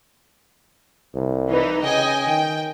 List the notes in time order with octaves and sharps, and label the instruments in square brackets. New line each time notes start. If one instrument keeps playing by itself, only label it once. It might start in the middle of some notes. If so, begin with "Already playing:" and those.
[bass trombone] C2
[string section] E3 D#4
[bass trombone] C#3 [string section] D#5 G5 G#5
[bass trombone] D#3 [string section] G5